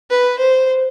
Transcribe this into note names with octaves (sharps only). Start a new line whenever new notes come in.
B4
C5